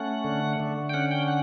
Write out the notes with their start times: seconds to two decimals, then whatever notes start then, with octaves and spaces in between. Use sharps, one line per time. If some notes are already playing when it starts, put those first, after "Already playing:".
Already playing: A3 C#4 F#5
0.24 D3
0.60 D3
0.90 G5
0.94 C#4 F#5
1.11 G5
1.28 F#5